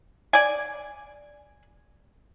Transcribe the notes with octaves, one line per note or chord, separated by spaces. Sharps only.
D5 G#5